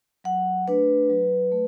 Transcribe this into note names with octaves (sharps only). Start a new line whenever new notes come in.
F#3 F#5
A3 D4 B4
F#3
A3